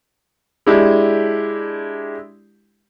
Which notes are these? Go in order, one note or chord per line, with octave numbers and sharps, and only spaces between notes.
G#3 D4 E4 G4